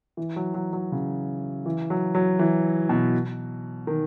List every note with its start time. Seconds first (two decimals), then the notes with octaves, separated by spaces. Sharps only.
0.17 E3
0.36 F#3
0.54 F#3
0.73 F#3
0.92 C#3
1.66 E3
1.90 F#3
2.15 F#3
2.39 E3
2.89 B2
3.87 D#3